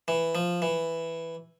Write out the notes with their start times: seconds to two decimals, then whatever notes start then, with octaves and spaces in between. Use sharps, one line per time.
0.08 E3
0.35 F3
0.62 E3